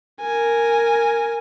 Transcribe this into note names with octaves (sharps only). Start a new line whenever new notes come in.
A#4 G#5